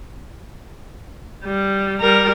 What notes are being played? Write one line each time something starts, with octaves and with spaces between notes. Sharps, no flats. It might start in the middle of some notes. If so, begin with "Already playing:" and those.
G3
G3 A#4